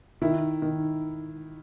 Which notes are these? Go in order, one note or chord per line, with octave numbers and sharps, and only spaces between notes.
D#3 E4
D#3